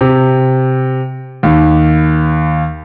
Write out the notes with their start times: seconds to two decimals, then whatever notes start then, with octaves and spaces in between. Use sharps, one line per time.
0.01 C3
1.43 D#2